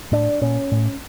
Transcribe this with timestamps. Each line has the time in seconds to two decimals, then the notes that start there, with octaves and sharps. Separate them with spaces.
0.12 A2 D4
0.41 A#2 C#4
0.72 A2